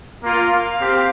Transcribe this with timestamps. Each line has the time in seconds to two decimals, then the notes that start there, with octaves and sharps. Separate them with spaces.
0.22 A#3 F4
0.51 F5
0.81 C4 G4